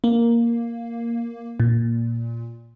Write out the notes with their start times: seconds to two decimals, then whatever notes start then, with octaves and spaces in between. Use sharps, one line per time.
0.04 A#3
1.60 A#2